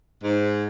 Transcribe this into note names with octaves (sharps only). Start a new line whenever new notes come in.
G#2